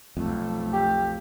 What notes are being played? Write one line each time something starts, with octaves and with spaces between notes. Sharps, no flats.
B1 F2 A3
G4